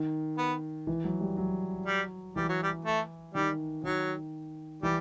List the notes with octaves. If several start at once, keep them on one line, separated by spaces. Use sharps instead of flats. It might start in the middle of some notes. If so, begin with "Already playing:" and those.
Already playing: D#3
B3
E3
F#3
G3
F#3
G3
E3 G3
F#3
G3
A3
D#3 G3
D#3 F#3
E3 G3